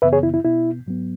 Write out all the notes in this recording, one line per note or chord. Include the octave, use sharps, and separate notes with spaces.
F#2 C#3 E3 B3 B4 E5
G#4 C#5
E4
E4
B2 B3 E4
G#2 F#3 B3